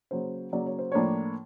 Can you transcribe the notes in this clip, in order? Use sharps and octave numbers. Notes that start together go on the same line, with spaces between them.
C#3 F#3 A#3 C5
C#3 F#3 A#3 D5
C#5
C5
A2 F3 A#3 D4 C#5